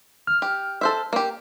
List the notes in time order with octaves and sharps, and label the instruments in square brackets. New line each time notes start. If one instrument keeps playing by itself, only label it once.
[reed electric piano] F6
[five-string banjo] G4
A4 C5 E5
A#3 G4